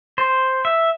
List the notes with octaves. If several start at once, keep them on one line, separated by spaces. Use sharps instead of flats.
C5
E5